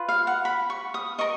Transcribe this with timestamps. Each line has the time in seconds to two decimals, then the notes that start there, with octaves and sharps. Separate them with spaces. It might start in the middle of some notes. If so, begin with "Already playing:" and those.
Already playing: F4 B4
0.09 F5
0.27 F#5
0.45 B5
0.70 C#6
0.94 D#6
1.18 A#4 D#5 C#6